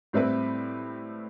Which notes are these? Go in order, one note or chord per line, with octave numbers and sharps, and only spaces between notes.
A2 G3 C4 E4 B4